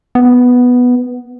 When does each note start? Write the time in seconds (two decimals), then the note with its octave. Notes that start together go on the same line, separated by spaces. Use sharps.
0.15 B3